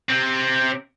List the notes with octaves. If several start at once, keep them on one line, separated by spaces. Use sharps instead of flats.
C3 C4